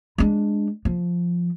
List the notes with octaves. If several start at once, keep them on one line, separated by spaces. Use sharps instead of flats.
G#3 D4
F3